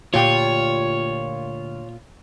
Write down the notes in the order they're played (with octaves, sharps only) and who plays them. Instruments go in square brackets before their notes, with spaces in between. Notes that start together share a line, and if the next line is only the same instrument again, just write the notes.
[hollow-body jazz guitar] D2 G4 [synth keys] A#2 F4 [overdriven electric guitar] C#5